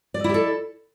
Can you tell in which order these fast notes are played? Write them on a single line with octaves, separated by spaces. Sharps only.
D5 D#5 E4 G4 A4